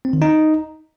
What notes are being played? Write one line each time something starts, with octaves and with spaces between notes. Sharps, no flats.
C4
D#3
D#4